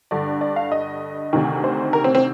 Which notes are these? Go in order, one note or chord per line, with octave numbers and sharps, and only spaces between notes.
G2 D3 D5
D5
F5
D#5
D2 C3 D#3
C5
A#4
C4
C4